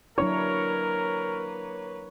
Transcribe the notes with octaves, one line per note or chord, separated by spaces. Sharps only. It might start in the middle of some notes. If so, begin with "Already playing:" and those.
F#3 A#3 D4 E4 A#4 B4 C#5